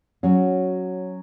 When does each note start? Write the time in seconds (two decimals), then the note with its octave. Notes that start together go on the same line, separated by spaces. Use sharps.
0.23 F#3 C#4 F#4